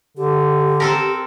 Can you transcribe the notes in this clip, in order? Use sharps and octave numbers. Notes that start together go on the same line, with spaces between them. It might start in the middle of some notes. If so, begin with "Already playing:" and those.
D3 G4
C4 A4 A#4